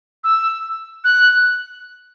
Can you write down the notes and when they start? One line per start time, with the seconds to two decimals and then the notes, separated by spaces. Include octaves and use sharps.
0.24 E6
1.04 F#6